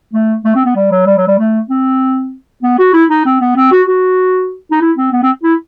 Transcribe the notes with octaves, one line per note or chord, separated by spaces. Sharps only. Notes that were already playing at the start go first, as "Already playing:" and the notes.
A3
A3
C4
B3
G3
F#3
G3
F#3
G3
A3
C4
B3
F#4
E4
D#4
C4
B3
C4
F#4
F#4
D#4
E4
C4
B3
C4
E4